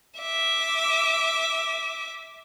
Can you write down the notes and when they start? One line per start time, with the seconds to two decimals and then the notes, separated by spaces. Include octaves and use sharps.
0.19 E5 D6